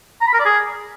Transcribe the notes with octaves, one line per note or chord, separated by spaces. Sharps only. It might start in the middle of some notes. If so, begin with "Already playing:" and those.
A#5
B5
A#4
D5
G#4